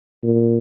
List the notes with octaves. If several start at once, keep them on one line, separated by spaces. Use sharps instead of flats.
A#2